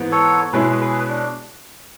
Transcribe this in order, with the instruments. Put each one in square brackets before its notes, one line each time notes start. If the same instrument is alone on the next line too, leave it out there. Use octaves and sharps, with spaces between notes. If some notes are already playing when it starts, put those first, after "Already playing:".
Already playing: [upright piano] G#2 E3 B3
[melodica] A4 C#5
[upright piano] B2 G#3 C#4 E4 [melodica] G#4 B4
[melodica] G#4 B4
D4